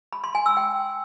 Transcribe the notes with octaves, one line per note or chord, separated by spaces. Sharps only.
B5
C6
G#5
E6
G5